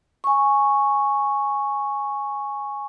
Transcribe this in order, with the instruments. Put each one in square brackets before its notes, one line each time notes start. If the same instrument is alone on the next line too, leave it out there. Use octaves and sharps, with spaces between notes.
[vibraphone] G#5 C#6